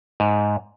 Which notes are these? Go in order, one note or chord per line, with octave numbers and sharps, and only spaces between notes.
G#2